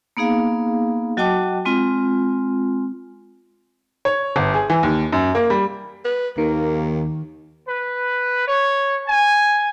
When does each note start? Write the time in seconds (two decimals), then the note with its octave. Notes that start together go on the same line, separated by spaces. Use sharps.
0.17 A#3 B3 D#4 G#4 F5
1.17 F#3 F#4 D#5 G5 A5 D6
1.65 G#3 C4 F4
4.05 C#5
4.36 G1
4.54 G#4
4.70 E3
4.83 D#2
5.12 F#2
5.35 A#3
5.50 G3
6.05 B4
6.38 D#2 D#3 A#3
7.68 B4
8.48 C#5
9.08 G#5